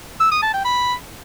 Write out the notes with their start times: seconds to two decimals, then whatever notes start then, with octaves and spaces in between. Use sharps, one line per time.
0.20 E6
0.31 D#6
0.42 A5
0.54 G5
0.65 B5